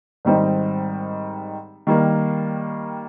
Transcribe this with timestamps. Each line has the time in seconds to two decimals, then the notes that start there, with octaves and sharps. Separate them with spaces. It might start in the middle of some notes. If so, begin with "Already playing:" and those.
0.25 G#2 D#3 G3 C4 D#4
1.87 D#3 G3 A#3